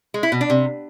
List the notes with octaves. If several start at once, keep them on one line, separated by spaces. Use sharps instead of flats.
G#3
E4
B2
D4
C3